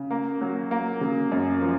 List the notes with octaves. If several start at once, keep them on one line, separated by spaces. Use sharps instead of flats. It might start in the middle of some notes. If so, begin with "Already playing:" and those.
Already playing: C#3
A#3
F#3
A#3
C#3
F#2
F3